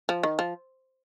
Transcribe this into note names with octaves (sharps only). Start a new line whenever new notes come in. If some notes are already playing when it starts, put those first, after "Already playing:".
F3
D#3
F3